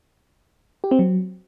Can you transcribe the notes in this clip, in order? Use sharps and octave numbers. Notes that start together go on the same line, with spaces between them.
G4
C4
F#3